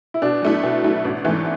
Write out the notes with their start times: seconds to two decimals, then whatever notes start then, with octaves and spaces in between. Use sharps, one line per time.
0.14 E4
0.22 B2 D4
0.42 F#3 A3 E4
0.63 B2
0.84 F#3 A3 E4
1.05 A1
1.24 G#2 E3 A3